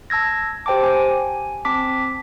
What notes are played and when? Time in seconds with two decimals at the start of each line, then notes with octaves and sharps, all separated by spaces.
0.10 A5 E6 G#6 A#6
0.66 G4 C5 G5 A5 D6
0.83 G#5
1.65 C4 A5 D6 B6